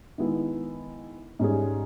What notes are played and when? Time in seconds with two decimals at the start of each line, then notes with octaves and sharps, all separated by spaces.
0.18 D#3 G#3 B3 E4
1.39 G#2 G3 C#4 G#4